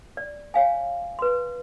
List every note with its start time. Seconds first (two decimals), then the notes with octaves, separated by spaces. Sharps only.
0.17 D5
0.54 C#5 F5 G#5
1.19 B4 C6